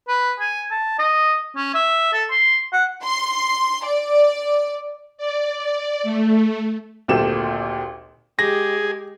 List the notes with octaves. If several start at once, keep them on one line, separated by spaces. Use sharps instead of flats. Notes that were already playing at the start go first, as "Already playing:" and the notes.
B4
G#5
A5
D#5
C#4
E5
A4
C6
F#5
C6
D5
D5
D5
A3
G#1 D2 A#2 G4 A4 E7
G#3 G4 G#4 A#6